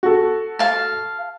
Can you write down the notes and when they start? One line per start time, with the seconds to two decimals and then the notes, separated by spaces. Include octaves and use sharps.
0.03 F#4 A4
0.59 F5 A5